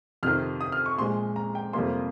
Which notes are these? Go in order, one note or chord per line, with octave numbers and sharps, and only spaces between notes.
F2 C3 D#3 F6
D#6
F6
C#6
A#2 F3 G#3 C6
A#5
G5
F2 C3 G3 A#3 C6